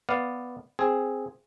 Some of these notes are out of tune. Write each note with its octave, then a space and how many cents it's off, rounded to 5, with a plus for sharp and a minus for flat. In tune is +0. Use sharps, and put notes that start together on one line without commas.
B3 +0 D5 +0 F5 +0
C4 +0 G#4 +0